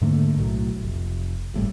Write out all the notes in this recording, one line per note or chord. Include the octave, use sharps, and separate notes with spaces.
G#2 D3 A3 A#3
B1 A2 F#3
F1
G#1 A2 G3